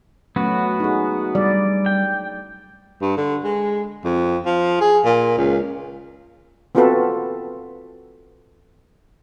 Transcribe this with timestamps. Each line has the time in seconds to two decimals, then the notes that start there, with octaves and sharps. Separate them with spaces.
0.36 F#3 A3 B3 C#4 F#4
0.80 D#4 G#4
1.35 G3 D5
1.86 G5
3.01 G2
3.17 D3
3.44 G#3
4.05 F2
4.46 F3
4.81 G#4
5.05 A#2
5.37 C#2
6.75 B3 C4 F4 F#4 A4 B4